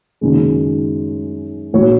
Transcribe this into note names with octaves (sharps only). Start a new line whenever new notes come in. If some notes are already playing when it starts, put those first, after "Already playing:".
F#1 F#2 D#3 G#3
A#1 F#3 C#5